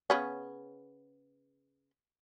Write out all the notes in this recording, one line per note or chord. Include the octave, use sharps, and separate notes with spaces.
C#3 B3 C#4